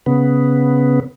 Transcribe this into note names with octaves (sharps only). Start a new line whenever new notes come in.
C#3 B3